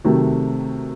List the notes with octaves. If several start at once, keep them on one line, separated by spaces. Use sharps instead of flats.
C3 D#3 F#3 A3